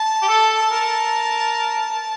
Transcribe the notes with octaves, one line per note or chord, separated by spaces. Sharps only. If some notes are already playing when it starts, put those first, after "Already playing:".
Already playing: A5
G4
A4
A4
A#4